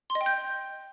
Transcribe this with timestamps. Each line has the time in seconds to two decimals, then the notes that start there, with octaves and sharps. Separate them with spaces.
0.10 C6
0.15 D#5
0.21 G5
0.26 G6